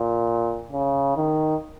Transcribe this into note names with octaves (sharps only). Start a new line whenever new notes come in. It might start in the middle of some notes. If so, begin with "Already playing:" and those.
Already playing: A#2
C#3
D#3